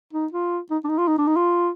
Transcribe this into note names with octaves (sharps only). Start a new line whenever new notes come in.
D#4
F4
D#4
D4
D#4
F4
D#4
D4
D#4
F4